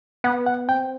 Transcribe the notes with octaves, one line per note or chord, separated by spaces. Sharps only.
B3 F#5
F#5
C4 G5